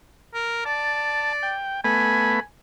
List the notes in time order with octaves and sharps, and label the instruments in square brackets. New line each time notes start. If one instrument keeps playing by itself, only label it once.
[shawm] A#4
[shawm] D5 [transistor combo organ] A5
[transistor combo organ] G5
[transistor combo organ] A3 B3 B5 [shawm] G#5